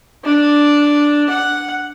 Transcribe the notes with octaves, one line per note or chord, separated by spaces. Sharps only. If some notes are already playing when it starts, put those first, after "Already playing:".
D4
F#5